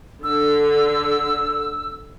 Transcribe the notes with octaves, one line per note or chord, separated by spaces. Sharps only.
D3 E6